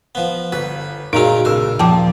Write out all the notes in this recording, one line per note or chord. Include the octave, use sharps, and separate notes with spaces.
F3 B3
G1 B4
A#2 C#3 G#3 D#4 F4 F#4 A#4 A#5
B1 C#3 A#4 E6
D#2 A#2 F3 G5 A5 D6